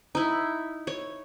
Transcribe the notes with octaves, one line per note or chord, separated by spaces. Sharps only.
D#4 E4
C#5